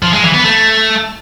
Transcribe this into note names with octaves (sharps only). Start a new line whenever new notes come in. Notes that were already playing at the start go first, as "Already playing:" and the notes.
F3
G#3
E3
B3
A3